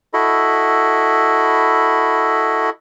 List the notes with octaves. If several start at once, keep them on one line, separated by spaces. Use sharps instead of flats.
E4 F#4 A4 D#5 B5